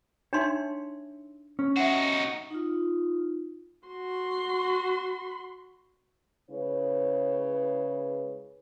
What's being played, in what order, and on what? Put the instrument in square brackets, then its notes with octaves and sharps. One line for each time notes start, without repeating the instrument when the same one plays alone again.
[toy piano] D4 D#4 C6 [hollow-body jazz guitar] C#5 E5
[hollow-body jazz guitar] C#4
[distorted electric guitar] D#4 F#4 [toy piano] E5 F#5
[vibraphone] D#4 F4
[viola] F#4 C6
[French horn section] C#3 G#3 E4 B4 C#5